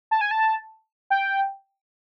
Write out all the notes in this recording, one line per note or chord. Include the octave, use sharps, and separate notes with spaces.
A5
G#5
A5
G5